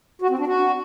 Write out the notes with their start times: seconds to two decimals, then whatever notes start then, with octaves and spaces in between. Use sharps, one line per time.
0.22 F#4
0.30 C4
0.39 D4
0.47 F#4